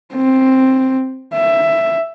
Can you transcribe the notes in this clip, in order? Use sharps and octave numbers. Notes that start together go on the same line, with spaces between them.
C4
E5